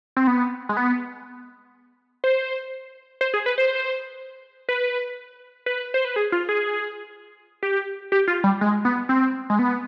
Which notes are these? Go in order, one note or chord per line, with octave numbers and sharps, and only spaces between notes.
C4
B3
G#3
B3
C5
C5
G#4
B4
C5
B4
B4
C5
B4
G#4
F4
G#4
G4
G4
F4
G3
G#3
B3
C4
G#3
B3